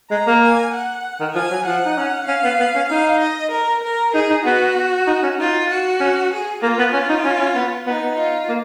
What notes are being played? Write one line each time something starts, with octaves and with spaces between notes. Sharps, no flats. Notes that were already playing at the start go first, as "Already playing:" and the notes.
G#3 A#5
A#3
G#5
F#5
D#3
F3 G#5
F#3
F3 F#5
D#4
C#4
C#4 F5
B3
B3
C#4
D#4 F5
D#5
A#4
A#4
D#4 G#4
D#4
B3 F#4
D#4
C#4
D#4 F4
F#4
C#4
G#4
A#3 F4
B3
C#4
D#4
C#4
C#4
B3
B3 D#4
B3
F4
A#3